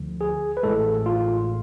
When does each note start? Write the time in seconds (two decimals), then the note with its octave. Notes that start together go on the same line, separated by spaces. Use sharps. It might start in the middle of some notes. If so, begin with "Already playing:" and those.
Already playing: D2 D3 F3
0.21 G#4
0.57 B4
0.63 A1 A2 G#3 A4
1.06 F4